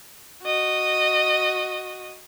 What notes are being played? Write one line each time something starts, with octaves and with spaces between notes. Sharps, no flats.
F#4 D#5